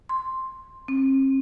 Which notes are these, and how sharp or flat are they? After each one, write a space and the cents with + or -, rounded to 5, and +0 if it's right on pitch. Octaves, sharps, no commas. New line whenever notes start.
C6 +5
C4 +45